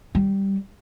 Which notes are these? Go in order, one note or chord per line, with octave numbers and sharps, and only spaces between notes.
G3